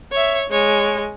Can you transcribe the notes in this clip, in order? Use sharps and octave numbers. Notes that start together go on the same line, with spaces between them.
C#5 E5
G#3 C#5